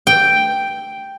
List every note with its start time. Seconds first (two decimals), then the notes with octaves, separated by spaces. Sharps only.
0.07 G5